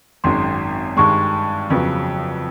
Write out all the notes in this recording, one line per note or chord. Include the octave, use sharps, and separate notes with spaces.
G#1 F#2 D#3 G#3 C6
G2 D#3 G#3 C#6
F2 C#3 F#3 B3